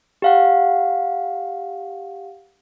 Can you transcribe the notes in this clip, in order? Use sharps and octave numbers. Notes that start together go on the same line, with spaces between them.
G4 F5 F#5